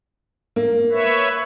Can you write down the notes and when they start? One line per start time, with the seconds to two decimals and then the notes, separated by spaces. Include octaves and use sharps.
0.56 A#3
0.91 B4 C#5 E5